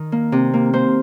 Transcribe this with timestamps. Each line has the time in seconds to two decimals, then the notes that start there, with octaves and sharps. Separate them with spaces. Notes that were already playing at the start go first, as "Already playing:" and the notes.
Already playing: D#3
0.12 A#3
0.32 C3
0.54 A#3
0.73 A#3 C5